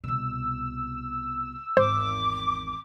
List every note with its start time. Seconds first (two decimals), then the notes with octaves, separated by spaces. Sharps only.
0.04 C2 B2 E6
1.77 G#1 E2 C5 D6